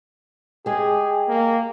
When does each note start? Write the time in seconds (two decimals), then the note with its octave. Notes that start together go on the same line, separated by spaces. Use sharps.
0.66 G#3 G4 G#4
1.28 A#3